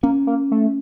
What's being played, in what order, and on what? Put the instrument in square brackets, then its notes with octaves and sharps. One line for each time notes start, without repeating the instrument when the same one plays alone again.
[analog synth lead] A#3 [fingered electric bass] C#4
[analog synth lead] A#3
A3